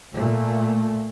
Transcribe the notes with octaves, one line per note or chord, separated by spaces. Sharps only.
A#2 A3